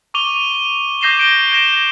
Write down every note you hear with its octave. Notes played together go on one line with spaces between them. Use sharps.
C#6 D6 D#7 F7 G7
D6 G6 A#6 C7 E7 G7
D7 G7
G6 A#6 D7 E7